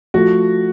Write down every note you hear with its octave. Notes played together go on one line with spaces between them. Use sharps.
F3 A3 F#4